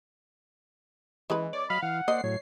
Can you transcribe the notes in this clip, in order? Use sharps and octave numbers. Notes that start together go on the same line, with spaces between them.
E3 G#3 C#4 B4
C#5 D5
F#3 D#5 F5 B5
E3 F#5
A#3 C5 D5 D#5 C7
A2 F#3 C#5